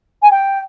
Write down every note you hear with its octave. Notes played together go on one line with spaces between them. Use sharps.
G#5
G5